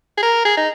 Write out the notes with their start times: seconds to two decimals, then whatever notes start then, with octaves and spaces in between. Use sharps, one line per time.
0.18 G#4
0.23 A#4
0.45 G#4
0.57 D#4